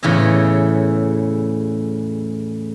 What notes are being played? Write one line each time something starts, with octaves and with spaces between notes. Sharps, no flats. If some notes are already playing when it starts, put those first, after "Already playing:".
E2 A2 C#3 E4 C#5 D#5